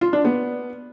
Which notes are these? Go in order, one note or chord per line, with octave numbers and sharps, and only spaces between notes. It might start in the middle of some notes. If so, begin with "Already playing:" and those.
F4
D4
B3